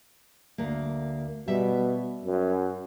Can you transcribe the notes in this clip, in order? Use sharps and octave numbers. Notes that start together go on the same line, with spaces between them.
D2 A#3
B2 G3 E5
F#2